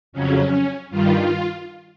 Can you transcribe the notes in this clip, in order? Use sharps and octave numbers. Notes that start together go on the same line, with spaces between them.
F2 C#3 F#3 C#4
G2 D#3 G3 F4